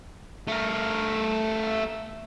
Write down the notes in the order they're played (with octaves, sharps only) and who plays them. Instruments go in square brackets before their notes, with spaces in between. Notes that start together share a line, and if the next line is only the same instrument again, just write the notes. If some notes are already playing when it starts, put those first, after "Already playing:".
[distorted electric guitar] A3 A#4